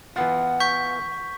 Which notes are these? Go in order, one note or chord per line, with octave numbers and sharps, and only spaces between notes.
E3 B3 F4 F#5
C#6 G6 B6